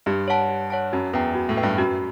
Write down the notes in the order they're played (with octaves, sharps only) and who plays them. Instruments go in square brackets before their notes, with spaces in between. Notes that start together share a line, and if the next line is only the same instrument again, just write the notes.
[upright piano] G2 [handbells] G4
[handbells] C#5 F#5 A5
G4
C#5 F#5 A5
[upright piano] F#2 [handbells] F#4
[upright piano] E2 [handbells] B4 E5 G5
[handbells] F#4
[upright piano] A2
[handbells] B4 E5 G5
[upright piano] G2
[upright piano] F#2 [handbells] F#4